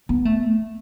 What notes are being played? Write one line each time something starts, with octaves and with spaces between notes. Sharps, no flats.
B3
A3